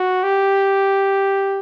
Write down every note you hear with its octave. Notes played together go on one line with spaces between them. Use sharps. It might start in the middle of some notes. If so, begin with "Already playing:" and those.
Already playing: F#4
G4